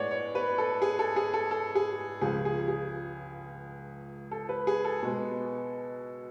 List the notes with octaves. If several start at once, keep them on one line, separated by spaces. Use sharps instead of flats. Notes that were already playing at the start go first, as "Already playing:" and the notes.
Already playing: A2 G#3 B3 C#5 D5 F#5
C#5
B4
A4
G#4
A4
G#4
A4
A4
G#4
C#2 C#3 F3 G#4
G#4
G#4
A4
B4
G#4
A4
B2 G#3 B3